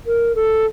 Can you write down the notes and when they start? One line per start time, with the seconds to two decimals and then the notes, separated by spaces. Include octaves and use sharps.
0.06 A#4
0.35 A4